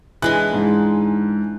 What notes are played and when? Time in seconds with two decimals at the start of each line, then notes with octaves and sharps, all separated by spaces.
0.22 E3 G#3 D4 F#6
0.53 G#2